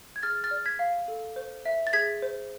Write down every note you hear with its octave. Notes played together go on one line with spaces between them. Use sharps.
G#6
G#4 F6 A6
F6 A6
D5
G#6 B6
F5
A4
C5
E5
A6
G#4 G#6 B6
C5